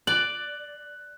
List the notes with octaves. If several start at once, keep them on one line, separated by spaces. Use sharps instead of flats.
D5 F#6 F#7